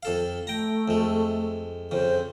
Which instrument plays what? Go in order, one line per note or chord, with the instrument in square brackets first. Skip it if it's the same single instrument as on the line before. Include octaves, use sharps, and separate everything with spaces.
[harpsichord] F2 A4 F5
[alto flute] A3 [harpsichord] G5 A#5
[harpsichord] F2 G#3
[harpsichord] F2 C#3 [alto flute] C5